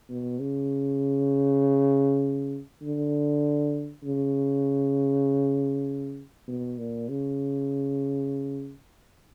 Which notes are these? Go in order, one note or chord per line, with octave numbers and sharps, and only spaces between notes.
B2
C#3
D3
C#3
B2
A#2
C#3